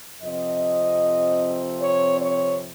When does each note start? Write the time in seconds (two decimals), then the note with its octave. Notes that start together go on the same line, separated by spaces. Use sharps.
0.22 F2 C3 F3 C4 D#5
1.81 C#5
2.21 C#5